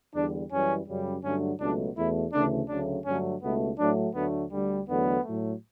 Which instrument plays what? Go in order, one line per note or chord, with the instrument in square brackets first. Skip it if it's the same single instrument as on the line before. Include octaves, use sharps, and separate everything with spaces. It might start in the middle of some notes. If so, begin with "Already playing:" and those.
[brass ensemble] E2 D3 G3 D4
F#2 E3 G3 C#4
F#2 C#3 G3
G2 D3 F#3 A3 C#4
C#2 B2 F#3 A3 D4
E2 B2 A3 E4
D2 C#3 E3 A3 D4
D2 C#3 F#3 A3 D4
G2 D3 F#3 A3 C#4
C#2 B2 A3 B3
A2 F#3 A3 D4
D2 D3 F#3 A3 B3
D2 D3 G3
E2 D3 F#3 A3 B3
A2 F#3 A3